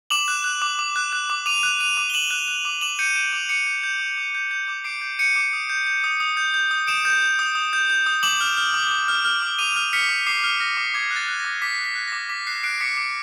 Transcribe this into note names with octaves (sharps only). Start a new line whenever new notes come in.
D6 E7 F#7
F#6
F#6
D6
D6
F#6
F#6
D6
D6 D#7 F7
F#6
F#6 D#7 F7
D6
G7
D6 E7 F#7
F#6
F#6
D6
D6 E7 F#7
G6 C#7 D#7
G6 D7 E7
D6 D#7 F7
D6 C#7 D#7
G6
G6
D6
D6
G6
G6
D6
D6 C7 D7
G6
G6 C#7 D#7
D6
D#6
G6
G6
D#6
D#6
G6
G6
D#6
D#6 D7 E7
G6
G6
D#6
D#6
G6
G6
D#6
D6 E7 F#7
F6
F6
D6
D6
F6
F6
D6
D6 D#7 F7
F6
F6 B6 C#7
D6
D6 C7
F6
F6 A#6
D6
D6 G#6
F#6
A6
F#6
A#6
D6
D6 B6
F#6
B6
F#6
D6 A#6
D6 B6
F#6 C7
F#6 C7 D7
D6 B6 C#7
D6 C7 D7